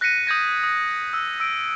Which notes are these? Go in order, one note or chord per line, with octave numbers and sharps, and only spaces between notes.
F#6 A#6 B6 C#7 D#7
D#6 G6 G#6 A#6
D#6
E6
E6 D7